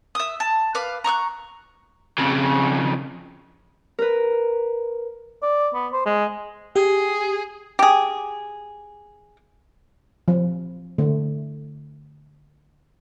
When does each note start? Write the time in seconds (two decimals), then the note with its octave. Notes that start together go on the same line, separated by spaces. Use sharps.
0.15 E5 D#6
0.40 A5
0.75 B4 F5 D6
1.04 A#5 C#6 D#6 F#6
2.19 F2 C#3
3.98 A#4 B4
5.42 D5
5.74 B3
5.93 C5
6.06 G#3
6.76 G4 G#4
7.79 G4 G#4
10.28 F3
10.98 D3 A3